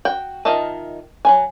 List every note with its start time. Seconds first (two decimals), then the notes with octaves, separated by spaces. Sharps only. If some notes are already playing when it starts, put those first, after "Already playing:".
0.05 F#4 G5
0.45 D#3 F4 D#5 E5 A5
1.25 F#3 E4 G#5